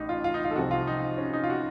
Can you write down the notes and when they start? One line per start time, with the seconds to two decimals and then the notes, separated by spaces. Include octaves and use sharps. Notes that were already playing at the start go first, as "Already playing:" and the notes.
Already playing: A1 A2 D#4
0.09 F4
0.24 F4
0.34 D#4
0.44 F4
0.51 A4
0.56 C2 C3 F3 F#4
0.71 F4
0.87 D#4
1.18 C#4
1.33 D#4
1.44 F4
1.50 F#4